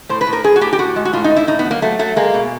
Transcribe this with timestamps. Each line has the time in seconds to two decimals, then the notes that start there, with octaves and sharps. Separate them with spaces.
0.09 A2 C5
0.21 B4
0.27 A2
0.33 A#4
0.44 A2 G#4
0.56 F#4
0.61 A2 G4
0.73 G4
0.79 A2 F#4
0.96 G#3
1.05 F#4
1.13 A2 F4
1.24 D#4
1.30 A2
1.36 E4
1.47 A2 D#4
1.59 B3
1.65 F#3
1.71 A#3
1.82 F#3 A3
1.99 F#3 A3
2.16 G#3 A#3
2.34 B2